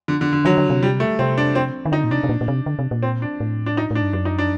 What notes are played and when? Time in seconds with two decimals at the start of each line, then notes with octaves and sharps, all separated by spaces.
0.08 D3
0.21 D3
0.33 D3
0.45 D#3 F#3
0.58 D3
0.70 C3
0.83 G3
1.00 A3
1.19 C3 C4
1.38 D4
1.55 C4
1.85 D#3
1.92 D3 D#4
2.04 A#2
2.11 C3 D4
2.24 C3
2.29 A#2
2.41 A#2
2.48 C3
2.66 D3
2.79 C3
2.91 A#2
3.03 C4
3.22 D4
3.40 A2
3.66 D4
3.77 D#4
3.91 A2 D4
4.02 G2
4.13 F#2 D4
4.25 D#4
4.39 D4